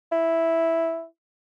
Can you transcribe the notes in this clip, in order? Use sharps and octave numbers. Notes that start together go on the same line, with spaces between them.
E4